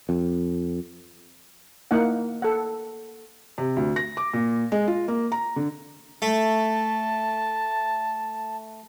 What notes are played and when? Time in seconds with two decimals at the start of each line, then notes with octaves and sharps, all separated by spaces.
0.09 F2
1.91 A#3 D#4 E4 F#5
2.42 A4 F#5
3.58 C3
3.76 D2
3.96 A#6
4.17 D6
4.33 A#2
4.72 G#3
4.87 F4
5.08 A#3
5.32 A#5
5.56 D3
6.22 A3 A5